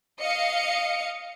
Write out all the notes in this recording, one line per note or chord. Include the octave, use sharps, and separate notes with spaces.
D#5 F5 C#7